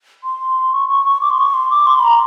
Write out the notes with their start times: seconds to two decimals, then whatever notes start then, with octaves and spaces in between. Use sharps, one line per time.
0.24 C6
0.72 C#6
0.89 C#6
1.06 C#6
1.21 D6
1.30 C6
1.38 C#6
1.54 C6
1.70 D6
1.87 C6
1.99 B5
2.03 A#5